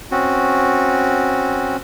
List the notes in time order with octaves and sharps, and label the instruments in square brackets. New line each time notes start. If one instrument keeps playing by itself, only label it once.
[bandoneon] C4 C#4 F#4